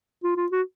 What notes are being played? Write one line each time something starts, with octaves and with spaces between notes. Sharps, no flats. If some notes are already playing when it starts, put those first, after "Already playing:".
F4
F4
F#4